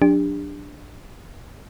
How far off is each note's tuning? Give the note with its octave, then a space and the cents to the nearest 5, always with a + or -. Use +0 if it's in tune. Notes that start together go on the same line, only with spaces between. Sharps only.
F#3 -30 D4 +0 G4 +35